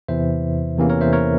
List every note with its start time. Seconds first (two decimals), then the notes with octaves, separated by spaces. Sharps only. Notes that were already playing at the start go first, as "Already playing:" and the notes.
0.08 E2 C3 E3 C5 E5
0.78 E2 C3 E3 A#3 C#4
0.90 A#4 C#5
1.01 C5 E5
1.13 A#4 C#5